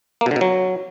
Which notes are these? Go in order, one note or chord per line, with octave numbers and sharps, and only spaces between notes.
A#3
B2
D3
B2
F#3